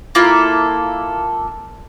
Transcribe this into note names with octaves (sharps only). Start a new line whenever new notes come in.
A#3 E4 F4 A4